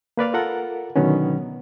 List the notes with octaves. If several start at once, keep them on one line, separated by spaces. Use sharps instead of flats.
A#3 B4 D5 F5
F4 A4 A#4 F#5
B2 D3 D#3 F#3 B3 C#4